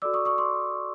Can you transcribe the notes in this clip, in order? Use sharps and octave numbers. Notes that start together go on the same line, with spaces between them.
F#4 A4 D5 D6 E6
C#6 D#6
C#6 D#6
C6 D6